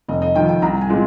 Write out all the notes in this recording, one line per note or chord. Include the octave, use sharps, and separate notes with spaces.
F1 D#5
D#5
F2 D#3 G5
G5
C2 A#5
G#5
A#2 G#3 C4